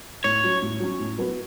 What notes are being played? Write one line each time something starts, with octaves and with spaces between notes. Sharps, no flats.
A2 C#5
F#3 C#4
A2
F#3 C#4
A2
F#3 B3 F#4 B4